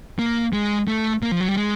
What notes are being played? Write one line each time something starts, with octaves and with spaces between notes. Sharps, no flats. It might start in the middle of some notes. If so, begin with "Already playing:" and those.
A#3
G#3
A3
A#3
F3
F#3
G3
G#3